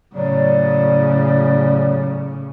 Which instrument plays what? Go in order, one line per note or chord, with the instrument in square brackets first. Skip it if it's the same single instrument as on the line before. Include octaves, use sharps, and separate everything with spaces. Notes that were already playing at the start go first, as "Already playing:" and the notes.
[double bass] A2 C#3 [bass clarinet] F#3 [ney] D5